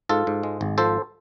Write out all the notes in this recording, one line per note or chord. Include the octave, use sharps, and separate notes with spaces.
G#2 F4 A4
G#2
G#3
G#1
F3 A4 C5